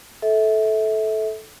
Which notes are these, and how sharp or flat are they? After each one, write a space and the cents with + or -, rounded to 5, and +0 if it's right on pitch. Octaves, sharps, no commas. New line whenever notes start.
A4 -15 E5 -25